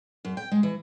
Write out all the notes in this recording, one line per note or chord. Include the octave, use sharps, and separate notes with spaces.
F#2
G5
G#3
E3